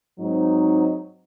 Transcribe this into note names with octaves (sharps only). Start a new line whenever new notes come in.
G#2 F#3 C4 D#4